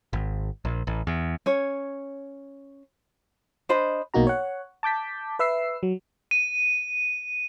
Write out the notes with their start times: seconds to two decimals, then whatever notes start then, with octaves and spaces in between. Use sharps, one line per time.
0.13 G#1
0.65 A#1
0.87 A1
1.07 E2
1.46 C#4 C#5
3.69 D4 C5 D#5 B5
4.14 B1 B2 A#3 D#4 F#4 A#5
4.27 C#5 F#5
4.83 A5 D6 G6 B6
5.39 B4 E5 E6 C7
5.83 F#3
6.31 D#7